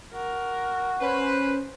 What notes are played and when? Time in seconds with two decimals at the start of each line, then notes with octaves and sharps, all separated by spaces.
0.13 F#4 A#4
1.01 C#4 B4 C5